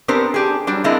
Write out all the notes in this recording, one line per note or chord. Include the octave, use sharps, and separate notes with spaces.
B3 C4 D4 G4 A#4 C5
D4 G4 G#4
F#3 G3 D4
G#3 A#3 C4 D4 E4